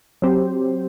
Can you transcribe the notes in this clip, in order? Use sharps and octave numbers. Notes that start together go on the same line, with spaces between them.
F#3 C4 G4 C5